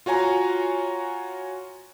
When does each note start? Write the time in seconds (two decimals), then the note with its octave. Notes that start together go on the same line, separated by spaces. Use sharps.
0.06 F4 F#4 C#5 G#5 A#5